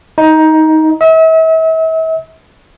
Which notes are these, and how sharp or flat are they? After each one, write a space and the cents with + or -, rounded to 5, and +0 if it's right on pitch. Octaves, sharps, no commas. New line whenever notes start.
D#4 +15
E5 -40